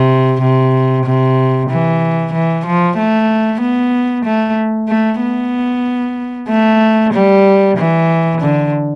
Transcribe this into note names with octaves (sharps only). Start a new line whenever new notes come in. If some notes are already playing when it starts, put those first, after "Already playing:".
Already playing: C3
C3
C3
E3
E3
F3
A3
B3
A3
A3
B3
A3
G3
E3
D3